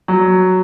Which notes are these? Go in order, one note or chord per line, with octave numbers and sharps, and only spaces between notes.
F#3